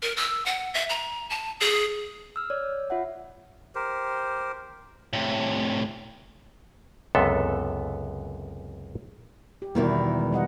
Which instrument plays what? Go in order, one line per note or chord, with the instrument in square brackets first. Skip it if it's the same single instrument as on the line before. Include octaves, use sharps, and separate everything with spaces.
[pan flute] A#4
E6
F#5
E5
A#5
A5
G#4
[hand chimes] E6 F6
C#5 D5
F4 E5 F#5
[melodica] G4 A#4 C5
[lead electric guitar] A2 C3
[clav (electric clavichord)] C#2 F#2 C3 B3 A4 E5
[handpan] G4
[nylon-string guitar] E2 B2 D#3 [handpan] G3 E4 A#4
[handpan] G#3
G3 D#5 F#5